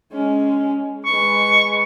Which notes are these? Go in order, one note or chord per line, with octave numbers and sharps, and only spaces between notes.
G#3 C#4
G#3 B4 C#6